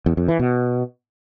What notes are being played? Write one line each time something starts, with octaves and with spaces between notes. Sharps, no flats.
E2
F2
E3
B2